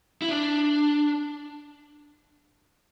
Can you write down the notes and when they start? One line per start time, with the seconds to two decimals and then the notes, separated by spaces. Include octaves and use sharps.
0.22 E4
0.29 D4